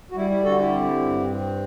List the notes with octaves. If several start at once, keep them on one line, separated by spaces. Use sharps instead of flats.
F#4
G3 E4
E4
D3 F#4 A4
E4 G4
C4
G2
C4